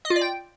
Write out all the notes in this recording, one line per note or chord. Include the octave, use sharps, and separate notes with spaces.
D#5
F4
D5
G5